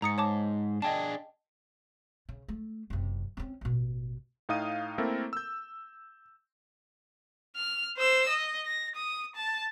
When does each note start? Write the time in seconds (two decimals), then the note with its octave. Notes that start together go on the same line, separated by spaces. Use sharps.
0.02 G#2 A#5 D#6 C#7
0.18 C#5 A5 D6
0.82 D4 G#4 D#5 G5 A5
2.29 C#3
2.48 A3
2.90 F#1 C3
3.37 C4 C#4
3.61 A1 B2
4.49 A2 D#4 F5 D#6 D#7
4.98 A3 A#3 C4 E4 A4 A#4
5.33 E6 G6
7.56 F6
7.97 C5 E6
8.29 D#5
8.65 A#6
8.96 D#6
9.36 A5